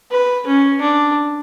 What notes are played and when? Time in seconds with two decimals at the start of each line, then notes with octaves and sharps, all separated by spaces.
0.11 B4
0.46 C#4
0.81 D4